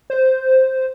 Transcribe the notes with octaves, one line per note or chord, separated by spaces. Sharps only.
C5